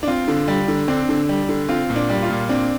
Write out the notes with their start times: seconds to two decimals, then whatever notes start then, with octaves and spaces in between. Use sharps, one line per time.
0.03 D4
0.08 C4 F4
0.28 D3
0.48 G3
0.68 D3
0.88 C4 D4
1.09 D3
1.29 G3
1.49 D3
1.69 C4 F4
1.90 A#2
1.96 D4
2.10 G3
2.23 F4
2.30 A#2
2.49 C4 D4